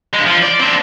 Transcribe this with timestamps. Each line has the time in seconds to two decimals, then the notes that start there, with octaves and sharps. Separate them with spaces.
0.13 G2 G#3
0.26 F3
0.42 D5
0.60 C4 D4